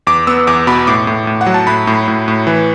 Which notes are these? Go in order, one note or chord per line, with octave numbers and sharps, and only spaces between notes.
E2 D6
B3 E6
E2 D6
B2 B5
A2 D6
A2
A2
F#5
F#3
A5
A2 B5
A2
A2
A2
E3